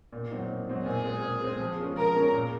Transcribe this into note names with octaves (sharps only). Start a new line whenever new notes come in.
A#2
F#3 C4 D#4
A#2
F#3 C4 D#4
A#2 G#4
G#3 C4
A#2
G#3 C4
F3
G#3 C#4 F4
F3 A#4
G#3 C#4 F4
A#2